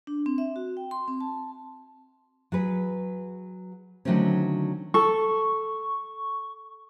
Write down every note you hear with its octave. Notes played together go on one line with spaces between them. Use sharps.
D4
C4
E5
F#4
G5
C6
C4
A5
F#3 G#4 B4
D3 D#3 F#3 A3 C4 C#4
A4 C#6